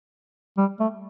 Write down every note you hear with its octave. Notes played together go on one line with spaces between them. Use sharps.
G3
A3